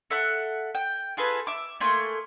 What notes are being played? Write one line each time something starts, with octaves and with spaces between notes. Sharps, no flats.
A4 E5 F#5 F#6
G5
F4 G#4 A4 B4
E5 D6
A3 A#3 G#5 C6